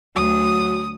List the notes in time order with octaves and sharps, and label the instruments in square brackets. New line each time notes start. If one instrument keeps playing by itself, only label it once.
[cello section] D2 [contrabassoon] F#3 [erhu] D#6